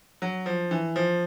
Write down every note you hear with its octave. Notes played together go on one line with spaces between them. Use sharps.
F#3
F3
E3
F3